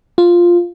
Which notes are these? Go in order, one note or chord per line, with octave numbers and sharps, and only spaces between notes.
F4